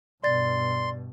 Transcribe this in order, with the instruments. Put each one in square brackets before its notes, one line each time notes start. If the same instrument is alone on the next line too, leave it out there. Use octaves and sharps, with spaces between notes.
[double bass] G2 B2 [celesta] D5 A6 [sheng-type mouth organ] C6